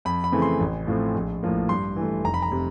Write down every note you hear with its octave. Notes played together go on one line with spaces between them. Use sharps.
F2 B5
B5
C#3 E3 A3 C4
C6
A1
A2 F3 A3 C4
A#1
A2 F3 A#3
G2 C6
E3 A3
F1 A#5
B5
A#5
C3